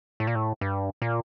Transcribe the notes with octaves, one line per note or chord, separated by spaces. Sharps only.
A2
A#2
A2
G2
A#2